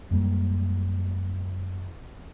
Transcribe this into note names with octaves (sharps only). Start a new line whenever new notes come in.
F#2 G3 G#3 A#3